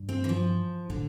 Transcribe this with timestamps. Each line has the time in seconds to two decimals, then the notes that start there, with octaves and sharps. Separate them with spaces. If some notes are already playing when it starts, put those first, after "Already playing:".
Already playing: G2
0.09 C4
0.24 E3
0.29 F3
0.89 A2 D3